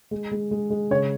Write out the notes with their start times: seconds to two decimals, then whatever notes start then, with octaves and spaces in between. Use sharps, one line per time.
0.11 G#3
0.31 G#3
0.51 G#3
0.70 G#3
0.90 C#3 C#5